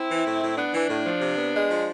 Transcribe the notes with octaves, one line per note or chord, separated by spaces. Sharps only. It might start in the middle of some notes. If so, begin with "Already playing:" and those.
Already playing: C4 E4
E3
A2
A2
B3 D4
E3
A2
F3
C3
B3
G#3
F3